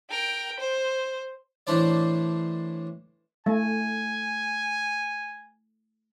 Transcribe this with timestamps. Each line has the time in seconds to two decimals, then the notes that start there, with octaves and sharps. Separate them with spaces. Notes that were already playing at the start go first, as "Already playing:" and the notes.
0.11 A#4 G5
0.60 C5
1.67 A2 E3 D4 C5 D5
3.46 A3 G#5